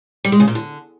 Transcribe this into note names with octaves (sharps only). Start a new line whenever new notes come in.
G3
G#3
C#3
A#2
D3